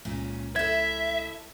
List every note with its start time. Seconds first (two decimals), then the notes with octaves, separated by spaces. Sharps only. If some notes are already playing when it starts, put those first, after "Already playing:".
0.05 C#2 A#2 C#4
0.56 E4 A4 E5 G#6